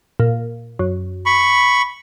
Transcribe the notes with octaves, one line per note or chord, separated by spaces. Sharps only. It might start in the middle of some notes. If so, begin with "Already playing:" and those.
A#2
F#2
B5 C#6